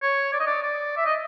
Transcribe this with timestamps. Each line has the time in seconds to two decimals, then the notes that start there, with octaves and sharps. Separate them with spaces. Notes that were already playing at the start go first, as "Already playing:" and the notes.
0.03 C#5
0.33 D5
0.40 D#5
0.47 D5
0.63 D5
0.97 E5
1.06 D#5